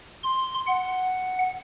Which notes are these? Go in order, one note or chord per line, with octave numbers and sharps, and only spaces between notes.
C6
F#5